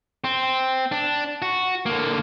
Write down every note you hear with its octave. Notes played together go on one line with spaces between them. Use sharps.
C4
D4
F#4
D3 A#3